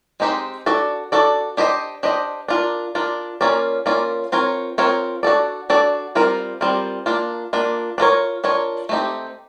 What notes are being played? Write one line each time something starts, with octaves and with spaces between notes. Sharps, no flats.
G#3 C4 D#4 G4 C5
D4 F#4 A4 D5
D4 F#4 A4 D5
D4 G4 C5 D#5
D4 G4 C5 D#5
D4 F4 A#4
D4 F4 A#4
A#3 C#4 F4 A#4 D5
A#3 C#4 F4 A#4 D5
C4 F4 A#4 C#5
C4 F4 A#4 C#5
D4 F#4 A4 D5
D4 F#4 A4 D5
G3 C4 F4 A#4
G3 C4 F4 A#4
A#3 D4 F4
A#3 D4 F4
D4 F4 A#4 C#5
D4 F4 A#4 C#5
A3 C4 D#4 G4